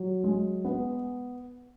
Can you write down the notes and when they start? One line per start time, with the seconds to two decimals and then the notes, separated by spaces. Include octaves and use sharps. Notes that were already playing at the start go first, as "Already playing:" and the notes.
Already playing: F#3
0.24 G#3
0.65 B3